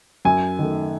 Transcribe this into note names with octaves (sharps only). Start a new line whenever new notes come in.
F#2 G#5
D#3 A3